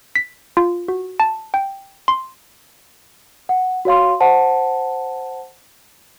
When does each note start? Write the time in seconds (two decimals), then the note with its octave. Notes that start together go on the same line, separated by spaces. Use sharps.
0.15 B6
0.57 F4
0.88 F#4
1.20 A5
1.54 G5
2.08 C6
3.49 F#5
3.85 F#4 C#5 F5 C6
4.20 C5 F#5 A5